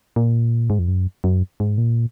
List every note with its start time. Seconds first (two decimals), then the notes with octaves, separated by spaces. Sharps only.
0.16 A#2
0.70 G#2
0.79 F2
0.88 F#2
1.24 F#2
1.60 G#2
1.78 A#2